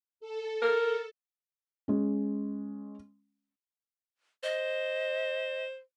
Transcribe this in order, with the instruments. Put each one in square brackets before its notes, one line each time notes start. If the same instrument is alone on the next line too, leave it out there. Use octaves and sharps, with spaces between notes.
[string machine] A4
[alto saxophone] A#4
[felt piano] G#3 C#4
[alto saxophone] C5 [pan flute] D#5